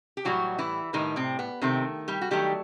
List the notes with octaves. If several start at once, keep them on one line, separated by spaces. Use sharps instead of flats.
G4
A2 E3 F#3 G3 F#4
E3 E4
A2 D#3 G3 D#4
C3 C4
B3
C3 D#3 A3 C4
G3 G4
F#4
D#3 F#3 G3 A3 G4